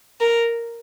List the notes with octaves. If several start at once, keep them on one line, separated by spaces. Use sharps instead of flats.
A#4